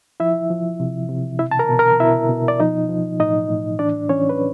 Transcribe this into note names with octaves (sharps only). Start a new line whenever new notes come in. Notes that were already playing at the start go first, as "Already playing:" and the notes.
F3 E4 E5
F3
C3
C3
B2 E4 E5
A5
A#4 A#5
B2
A#4 A#5
B2 E4 E5
B2
D5
F3 D#4 D#5
F3
A2 D#4 D#5
A2
E3 D4 D5
E3 C#4 C#5
B4